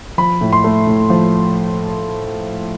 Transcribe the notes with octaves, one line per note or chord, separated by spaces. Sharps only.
F3 B5
A2
C6
A3
A2
F3